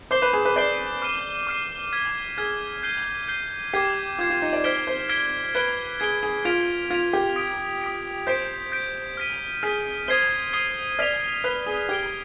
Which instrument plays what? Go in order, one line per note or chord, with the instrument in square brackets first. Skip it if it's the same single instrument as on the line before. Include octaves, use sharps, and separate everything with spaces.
[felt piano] C5 [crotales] D6 G6 C7 G7
[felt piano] B4
G#4
B4
[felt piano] D5 [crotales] D6 G6 C7 G7
[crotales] D6 F6 C7 D#7
D6 F6 C7 D#7
F6 G#6 B6
[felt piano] G#4 [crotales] F6 G#6 B6
[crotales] G6 C7 D#7 G7
G6 C7 D#7 G7
[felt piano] G4 [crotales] D6 G#6 C7
[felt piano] F4 [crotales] D6 G#6 C7
[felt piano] F4
D#4
D5
[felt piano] C5 [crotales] F6 G#6 B6 D7 G7
[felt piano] C5
[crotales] F6 G#6 B6 D7 G7
[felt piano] B4 [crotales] G#6 D7 G7
[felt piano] G#4 [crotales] G#6 D7 G7
[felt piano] G#4
[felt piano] F4 [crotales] G#6 B6 D7 F7
[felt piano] F4 [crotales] G#6 B6 D7 F7
[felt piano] G4
[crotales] D#6 B6 D7
D#6 B6 D7
[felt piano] C5 [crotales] G6 B6 D7
[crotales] G6 B6 D7
F6 B6 D#7
[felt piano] G#4 [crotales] F6 B6 D#7
[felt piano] C5 [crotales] D#6 G#6 C7 D#7 G7
[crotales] D#6 G#6 C7 D#7 G7
[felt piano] D5 [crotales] F6 B6 F7
[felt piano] B4 [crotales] F6 B6 F7
[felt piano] G#4
[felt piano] G4 [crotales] G#6 D7 G7